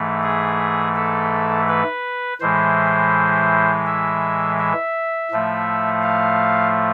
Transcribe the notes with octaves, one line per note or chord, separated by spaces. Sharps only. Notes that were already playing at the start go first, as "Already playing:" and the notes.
Already playing: G#2 E3 A3
G#4
A4
B4
A2 E3 G#3 C5
E5
E5
A2 F3 A3
F5